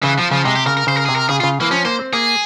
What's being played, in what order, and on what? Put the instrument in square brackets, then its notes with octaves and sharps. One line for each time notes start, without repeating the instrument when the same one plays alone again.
[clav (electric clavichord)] C#3 [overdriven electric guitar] E3
[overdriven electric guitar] F3
[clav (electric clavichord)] C#3 [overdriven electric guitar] F3
[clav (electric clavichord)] C3 [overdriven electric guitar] G#3
[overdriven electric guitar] G4
[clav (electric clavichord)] C#3 [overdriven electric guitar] A#4
[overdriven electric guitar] A#4
[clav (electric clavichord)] C#3 [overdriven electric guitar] C5
[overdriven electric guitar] A#4
[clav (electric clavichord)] C3 [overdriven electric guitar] G#4
[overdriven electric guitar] A#4
[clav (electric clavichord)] C#3 [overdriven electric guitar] G#4
[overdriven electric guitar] F4
[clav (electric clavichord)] C#3
[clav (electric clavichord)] E3 [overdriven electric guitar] A#3
[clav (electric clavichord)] F3 [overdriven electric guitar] C#4
[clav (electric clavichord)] A#3 [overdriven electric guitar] C5
[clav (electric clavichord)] C4
[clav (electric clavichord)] A#3 [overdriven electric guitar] G#4